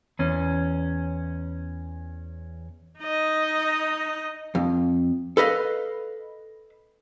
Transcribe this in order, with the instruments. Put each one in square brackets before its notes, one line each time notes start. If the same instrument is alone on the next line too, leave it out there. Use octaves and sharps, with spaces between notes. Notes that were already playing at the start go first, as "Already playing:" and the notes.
[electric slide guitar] E2 C#4
[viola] D#4 D#5
[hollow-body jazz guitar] F2
A4 B4 D#5 F5